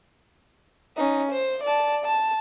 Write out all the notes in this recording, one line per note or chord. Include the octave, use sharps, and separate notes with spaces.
C#4 D#4
C5
D5 A5
A5